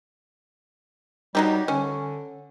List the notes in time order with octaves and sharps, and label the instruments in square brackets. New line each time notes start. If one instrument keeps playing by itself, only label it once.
[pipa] F#3 D#4 G4 [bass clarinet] G3
[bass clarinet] D3 [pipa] C#4